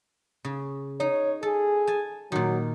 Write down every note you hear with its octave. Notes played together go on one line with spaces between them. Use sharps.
C#3
D#4 C#5
G#4 A4
G#5 A5
A#2 D#3 F#3